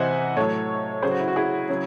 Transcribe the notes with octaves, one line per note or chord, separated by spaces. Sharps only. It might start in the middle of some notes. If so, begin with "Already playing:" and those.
Already playing: C3 E3 C5 D#5 E5 F#5 G#5
A2 F#3 A4 C#5
C#3 F#3 G#4 C5
F#4
E4
F#4
E4 G#4
C#3 F#3